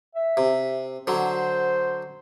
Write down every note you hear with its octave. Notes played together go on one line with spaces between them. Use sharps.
E5
C3
D3 F#3 C5